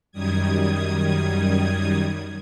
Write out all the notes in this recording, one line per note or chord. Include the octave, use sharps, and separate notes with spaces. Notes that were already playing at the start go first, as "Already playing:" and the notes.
F#2 D#3 G3 D#6 G#6